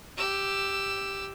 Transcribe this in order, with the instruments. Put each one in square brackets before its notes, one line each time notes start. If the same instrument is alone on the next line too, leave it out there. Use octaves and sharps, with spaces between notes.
[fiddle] G4 E6